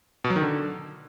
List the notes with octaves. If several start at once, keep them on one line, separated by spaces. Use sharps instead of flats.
B2
F#3
D#3
D3